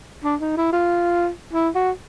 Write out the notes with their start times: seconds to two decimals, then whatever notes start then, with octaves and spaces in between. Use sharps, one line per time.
0.24 D4
0.41 D#4
0.57 E4
0.72 F4
1.53 E4
1.75 F#4